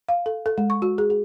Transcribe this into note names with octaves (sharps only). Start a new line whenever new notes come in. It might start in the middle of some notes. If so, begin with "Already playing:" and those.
F5
A4
A4
G#3
C#6
F#4
G#4
G#4